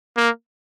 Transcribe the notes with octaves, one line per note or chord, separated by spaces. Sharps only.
A#3